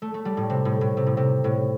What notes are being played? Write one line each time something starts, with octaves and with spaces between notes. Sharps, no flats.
A3
A3
G3
A2
C3
A2
A2
C3
A2
C3
A2